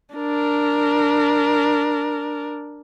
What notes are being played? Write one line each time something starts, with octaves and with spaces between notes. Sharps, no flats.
D4 A#4